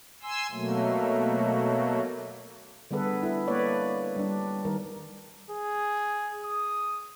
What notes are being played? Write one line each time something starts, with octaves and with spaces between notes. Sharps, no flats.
G#5 C6 E6
B2 F#3 A3 A#3
D3 G3 B3 G#4 A4 B4
E4 A4
A#3 B4 C#5 D5
G3 D4
D#3 G3 A#4
G#4
D#6